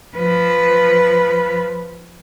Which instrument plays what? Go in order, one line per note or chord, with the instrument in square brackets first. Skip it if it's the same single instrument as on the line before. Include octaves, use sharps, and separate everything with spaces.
[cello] F3 B4